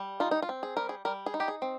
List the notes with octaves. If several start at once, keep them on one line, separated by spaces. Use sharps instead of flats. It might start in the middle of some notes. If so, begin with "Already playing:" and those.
Already playing: G3
D#4 F4
D#4
F4
C4
G#4
G3 A#4
G#4
G3 A#4
G#4
D#4
G4
G#4
C4